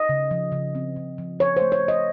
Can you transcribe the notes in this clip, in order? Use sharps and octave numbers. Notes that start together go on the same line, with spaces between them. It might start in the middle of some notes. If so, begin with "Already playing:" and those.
Already playing: D#5
C#3
F3
C#3
C4
C#3
F3
F3 C#5
A3 C5
C#5
F3
D#5